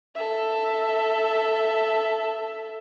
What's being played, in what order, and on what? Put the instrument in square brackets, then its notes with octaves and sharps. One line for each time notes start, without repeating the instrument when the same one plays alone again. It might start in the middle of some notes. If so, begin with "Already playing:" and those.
[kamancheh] A4 E5